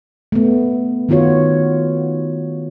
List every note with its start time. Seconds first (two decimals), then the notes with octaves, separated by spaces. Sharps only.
0.32 A3 B3
1.09 D#3 B3 F4 F#4 C#5